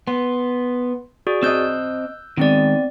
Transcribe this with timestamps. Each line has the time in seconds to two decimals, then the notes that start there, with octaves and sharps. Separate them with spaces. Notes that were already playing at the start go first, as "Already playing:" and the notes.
0.07 B3 C6
1.27 F#4 G#4 D5
1.43 C4 D#5 E6 F#6 G6
2.37 D#3 G#3 B3 C4 D5